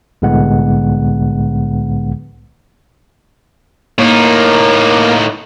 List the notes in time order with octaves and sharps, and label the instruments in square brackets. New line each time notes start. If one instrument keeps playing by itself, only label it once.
[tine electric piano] C2 A2 D3 G#3 B3 F#5
[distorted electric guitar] A2 D#4 [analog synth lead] A#3